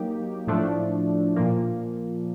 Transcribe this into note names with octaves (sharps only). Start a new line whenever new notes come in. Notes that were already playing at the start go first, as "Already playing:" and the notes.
Already playing: F#3 A#3 D#4 G4
A2 F3 A3 D4
A#2 F3 A#3